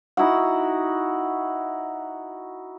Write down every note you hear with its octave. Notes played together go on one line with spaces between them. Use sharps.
D#4 E4 F#4 F#5